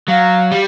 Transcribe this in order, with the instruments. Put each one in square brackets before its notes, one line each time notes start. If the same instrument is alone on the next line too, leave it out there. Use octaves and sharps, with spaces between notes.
[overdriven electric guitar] F#3 [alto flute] F5
[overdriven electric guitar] G3